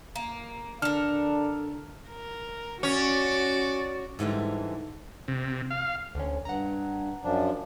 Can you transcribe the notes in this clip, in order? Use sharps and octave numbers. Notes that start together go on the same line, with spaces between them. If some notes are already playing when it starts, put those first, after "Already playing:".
A#3
D3 D4 A4 A#4 F6
A#4
C#4 F#4 D5
G#2 D3 E3 G3
C3
F5
D2 D3 C#4
G2 F#5 A#5
F#2 F3 D4